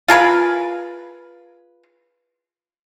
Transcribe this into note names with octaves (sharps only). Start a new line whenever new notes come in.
F4 G#4 A#4 B4